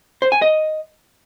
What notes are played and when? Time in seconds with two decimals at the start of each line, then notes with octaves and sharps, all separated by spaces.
0.22 C5
0.32 G#5
0.42 D#5